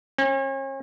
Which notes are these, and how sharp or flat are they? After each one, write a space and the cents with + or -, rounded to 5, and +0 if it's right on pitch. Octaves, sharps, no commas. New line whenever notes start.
C#4 -40